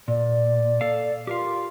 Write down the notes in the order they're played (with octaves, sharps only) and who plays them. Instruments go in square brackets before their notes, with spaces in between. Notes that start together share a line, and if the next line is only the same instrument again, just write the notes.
[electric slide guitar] A#2 [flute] D5
[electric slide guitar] A4 F5
[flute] F4 [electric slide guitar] G4 A#4 F5